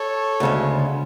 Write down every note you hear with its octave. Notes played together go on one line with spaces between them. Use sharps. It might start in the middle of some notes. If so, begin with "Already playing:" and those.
Already playing: A4 C#5
D2 C#3 G#3